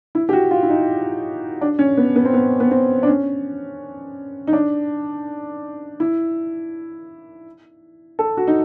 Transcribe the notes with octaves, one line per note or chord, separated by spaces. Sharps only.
E4
G4
F#4
F4
E4
D#4
D4
C#4
B3
B3
C4
B3
B3
C4
D4
C#4
D#4
D4
E4
A4
F#4
D#4